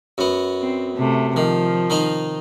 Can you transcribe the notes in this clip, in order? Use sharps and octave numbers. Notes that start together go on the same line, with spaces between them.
F#2 B3
C4
C3 A3
D#3 F3
D#3 D#4 C5